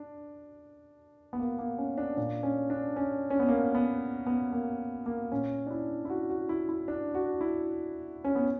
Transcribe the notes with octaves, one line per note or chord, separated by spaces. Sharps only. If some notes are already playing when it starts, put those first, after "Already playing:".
Already playing: D4
B3
A#3
A#3
C#4
D4
A#2 D4
C#4
D4
C#4
C#4
B3
A#3
B3
B3
A#3
A#3
A#2 C#4
D4
E4
E4
F#4
F#4
E4
E4
D4
F#4
E4
C#4
B3